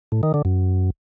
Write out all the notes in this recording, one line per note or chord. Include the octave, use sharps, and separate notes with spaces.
A2
D#3
D3
F#2